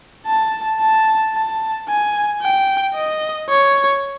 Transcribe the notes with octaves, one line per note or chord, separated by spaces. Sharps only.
A5
A5
A5
G#5
G5
D#5
C#5